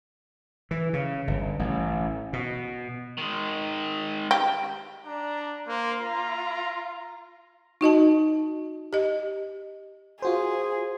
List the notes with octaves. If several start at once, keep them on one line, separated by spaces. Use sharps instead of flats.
E3
C#3
G1
A1
B2
D#3 G#3
G4
D4 A#5
A#3 C5
F4 A#5
D#4 F#4 D#5 A5
G4 D#5
F4 F#4 G#4 C5